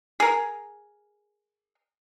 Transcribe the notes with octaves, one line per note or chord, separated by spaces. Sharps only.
G#4 A#4